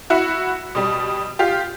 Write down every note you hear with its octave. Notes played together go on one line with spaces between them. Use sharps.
E4 F#4
B2 G3
F4 G4